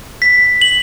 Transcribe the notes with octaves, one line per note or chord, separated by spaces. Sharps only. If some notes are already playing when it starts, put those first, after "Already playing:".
B6
F#7